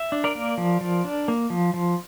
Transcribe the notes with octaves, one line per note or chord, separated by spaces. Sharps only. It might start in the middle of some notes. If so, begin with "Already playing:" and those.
Already playing: E5
D4
A#4 D5
A#3
F3
F3
D4
A#3
F3
F3